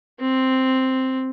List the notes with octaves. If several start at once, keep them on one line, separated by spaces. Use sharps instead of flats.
C4